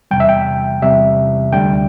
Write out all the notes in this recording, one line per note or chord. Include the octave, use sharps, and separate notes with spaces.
E2 C3 G3 G5
E5
G5
E2 C3 G3 E5
D2 D3 G3 G5